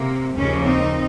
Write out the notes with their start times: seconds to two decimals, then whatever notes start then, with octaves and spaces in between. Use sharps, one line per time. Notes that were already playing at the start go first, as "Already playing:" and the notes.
Already playing: C3 A#3
0.36 D#2 C#3 F3 A#3 C#4
0.64 C4 D#4